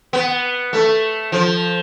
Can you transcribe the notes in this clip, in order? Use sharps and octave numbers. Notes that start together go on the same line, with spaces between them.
B3
A3
F3